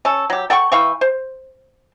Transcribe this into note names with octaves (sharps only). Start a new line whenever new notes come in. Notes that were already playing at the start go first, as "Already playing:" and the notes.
C#4 A4
F#3 G4
A4 F#5 G5 C#6
E3 F5 G5 C#6
C5